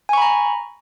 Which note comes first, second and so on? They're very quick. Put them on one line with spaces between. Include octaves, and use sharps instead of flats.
G#5 C#6 B5 A#5